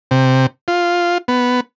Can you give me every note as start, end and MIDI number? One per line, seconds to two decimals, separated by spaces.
0.11 0.46 48
0.68 1.18 65
1.28 1.60 59